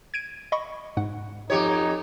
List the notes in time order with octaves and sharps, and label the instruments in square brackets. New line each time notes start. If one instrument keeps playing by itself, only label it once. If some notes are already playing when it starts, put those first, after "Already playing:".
[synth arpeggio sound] G#6 D7 D#7
D#5 B5 C#6
G#2 F#5
[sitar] F2 G4 C#5 [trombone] D#4